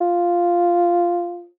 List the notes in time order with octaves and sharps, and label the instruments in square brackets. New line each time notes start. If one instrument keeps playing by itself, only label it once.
[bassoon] F4